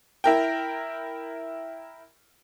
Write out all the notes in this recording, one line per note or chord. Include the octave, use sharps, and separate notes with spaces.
E4 A#4 G5